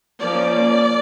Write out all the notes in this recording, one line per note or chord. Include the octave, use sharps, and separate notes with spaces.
F3 A#3 C#4 D5